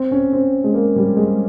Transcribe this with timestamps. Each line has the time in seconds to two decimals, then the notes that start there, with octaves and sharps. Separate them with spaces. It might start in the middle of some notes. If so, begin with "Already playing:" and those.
Already playing: C4
0.11 C#4
0.33 C4
0.64 G#3
0.74 A#3
0.96 G3
1.17 G#3